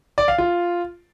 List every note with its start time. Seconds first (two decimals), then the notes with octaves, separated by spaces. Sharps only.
0.18 D5
0.28 F5
0.38 F4